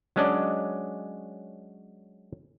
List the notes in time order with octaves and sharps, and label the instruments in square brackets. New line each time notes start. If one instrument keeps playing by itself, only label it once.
[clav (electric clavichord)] F#3 G#3 C#4 D4 D5 D#5